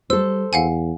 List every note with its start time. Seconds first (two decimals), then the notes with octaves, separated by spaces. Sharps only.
0.10 G3 A4 C5 E6
0.53 E2 F5 F#5 G#5